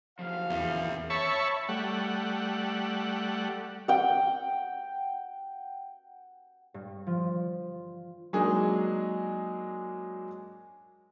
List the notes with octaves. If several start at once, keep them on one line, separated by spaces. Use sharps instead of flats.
F#1 F3 G4 F5
E2 A#4 E5
C#5 E5 A5 B5 C#6
G3 A3 F#5
F#5 G5
G2
F3
F#3 G#3 A#3 D4 D#4 G#4